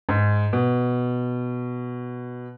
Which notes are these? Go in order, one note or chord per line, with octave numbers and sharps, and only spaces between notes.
G#2
B2